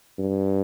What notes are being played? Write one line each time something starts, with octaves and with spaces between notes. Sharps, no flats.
G2